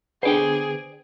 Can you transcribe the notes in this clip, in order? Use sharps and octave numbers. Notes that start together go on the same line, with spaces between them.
D3 B3 G#4 C5 D5 G5